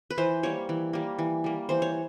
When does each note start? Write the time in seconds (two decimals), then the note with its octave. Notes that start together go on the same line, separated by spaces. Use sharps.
0.10 B4
0.18 E3 C5
0.43 G3 A#3 C#5
0.69 E3
0.93 G3 A#3
1.19 E3
1.44 G3 A#3
1.69 E3 C5
1.82 C#5